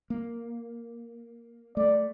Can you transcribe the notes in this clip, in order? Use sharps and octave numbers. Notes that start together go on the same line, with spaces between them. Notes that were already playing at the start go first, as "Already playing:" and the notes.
A#3
A3 D5